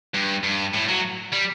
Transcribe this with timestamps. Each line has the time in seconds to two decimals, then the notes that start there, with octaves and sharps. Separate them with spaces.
0.14 G2
0.44 G2
0.74 A2
0.89 F#3
1.33 G3